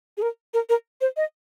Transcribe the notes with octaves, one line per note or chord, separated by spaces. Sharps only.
G#4
A#4
A#4
A#4
C5
D#5